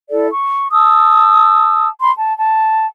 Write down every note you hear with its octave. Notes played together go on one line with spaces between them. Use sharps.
E4 A4 D5
C#6
A5 D#6 E6
B5 C6
A5
A5